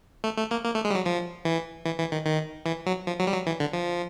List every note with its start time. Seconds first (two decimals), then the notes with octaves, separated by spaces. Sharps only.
0.24 A3
0.38 A3
0.51 A#3
0.65 A#3
0.75 A3
0.85 G#3
0.90 G3
0.95 F#3
1.06 F3
1.45 E3
1.85 E3
1.99 E3
2.12 D#3
2.26 D#3
2.66 E3
2.86 F#3
3.07 F3
3.20 F#3
3.27 G3
3.33 F#3
3.47 E3
3.60 D3
3.73 F3